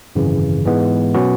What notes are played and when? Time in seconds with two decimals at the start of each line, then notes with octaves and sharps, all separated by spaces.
0.15 G#1 F#2 C#3 E3
0.66 G#2 E3 G#3 B3
1.14 B2 F#3 C#4 F#4 B4